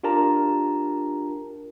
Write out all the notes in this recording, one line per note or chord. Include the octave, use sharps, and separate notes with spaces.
D4 F4 G4 A#4 A5 A#5